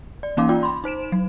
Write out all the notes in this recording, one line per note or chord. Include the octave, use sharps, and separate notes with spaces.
D5
E3 A#3 C#4 D#4 F5 D6
F4 D5 G5
B5 C6
D#4 C5 D7 E7
F#3